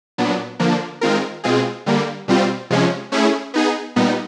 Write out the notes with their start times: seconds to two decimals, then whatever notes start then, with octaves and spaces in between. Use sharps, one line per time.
0.18 A#2 F#3 B3 D4
0.59 D3 F3 A#3 D4
1.01 D#3 G#3 C4 F4 A#4
1.44 B2 G#3 C4 F4 G#4
1.86 D3 G3 A#3
2.28 B2 G3 C4 F4
2.70 C3 F3 G#3 C#4
3.12 A3 C#4 E4 G#4
3.54 B3 D#4 G#4
3.96 A#2 G3 B3 D#4